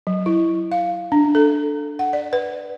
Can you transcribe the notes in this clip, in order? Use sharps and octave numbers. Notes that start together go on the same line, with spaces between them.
F#3
E4
F5
D4
A4
F#5
D5
B4